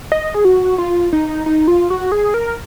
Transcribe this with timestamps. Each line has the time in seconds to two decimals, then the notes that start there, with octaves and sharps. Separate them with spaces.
0.12 D#5
0.34 G#4
0.45 F#4
0.78 F4
1.13 D#4
1.46 D#4
1.68 F4
1.90 F#4
2.12 G#4
2.34 A#4